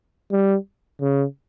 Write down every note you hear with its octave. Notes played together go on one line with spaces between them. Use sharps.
G3
C#3